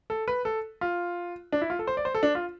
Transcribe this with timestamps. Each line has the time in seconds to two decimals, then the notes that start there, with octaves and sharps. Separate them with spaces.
0.10 A4
0.28 B4
0.45 A4
0.81 F4
1.53 D4
1.62 E4
1.70 F4
1.79 A4
1.87 C5
1.97 D5
2.05 C5
2.15 A4
2.23 D4
2.35 F4